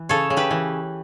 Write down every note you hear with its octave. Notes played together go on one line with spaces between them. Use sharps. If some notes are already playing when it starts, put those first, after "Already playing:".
Already playing: E3
C#3 A4 C#5
C#3
G4 B4
E3